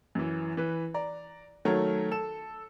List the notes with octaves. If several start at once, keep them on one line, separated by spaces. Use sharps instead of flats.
F#2 E3
E3 B4
D5 A#5
D#3 F#3 A3 A#4 C#5
A4 E7